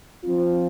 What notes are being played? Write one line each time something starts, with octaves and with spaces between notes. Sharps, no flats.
F3 C4 F4